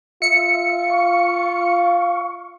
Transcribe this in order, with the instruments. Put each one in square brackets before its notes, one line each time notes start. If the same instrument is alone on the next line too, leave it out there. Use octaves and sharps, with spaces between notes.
[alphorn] F4 [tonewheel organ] E5 [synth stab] C#7
[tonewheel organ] F5 C#6